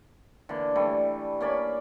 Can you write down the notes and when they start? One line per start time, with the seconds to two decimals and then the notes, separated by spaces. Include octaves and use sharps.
0.49 D3 E3 A#3
0.76 E3 G3 A3
1.41 A#3 C#4 D5 B5